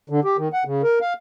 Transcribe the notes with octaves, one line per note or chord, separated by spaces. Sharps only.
D3
G4
D#3
F#5
C#3
A#4
F5